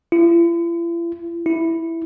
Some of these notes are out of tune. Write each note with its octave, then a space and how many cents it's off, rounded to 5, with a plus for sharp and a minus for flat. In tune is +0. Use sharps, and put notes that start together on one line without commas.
E4 +45
E4 +0